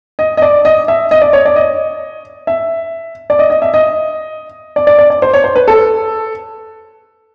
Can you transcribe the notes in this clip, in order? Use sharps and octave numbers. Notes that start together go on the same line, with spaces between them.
D#5
D#5
D5
D#5
E5
D#5
D5
C#5
D5
D#5
E5
D5
D#5
D#5
E5
D#5
D5
D5
D5
D5
C5
C#5
C5
B4
A4